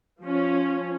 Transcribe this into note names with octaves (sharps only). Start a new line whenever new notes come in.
F3 C#4